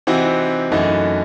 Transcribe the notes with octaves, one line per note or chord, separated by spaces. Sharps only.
C3 E3 C4 D#4 F#4
F#2 E3 A3 D#4 F#4